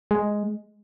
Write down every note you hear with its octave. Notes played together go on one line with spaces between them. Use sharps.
G#3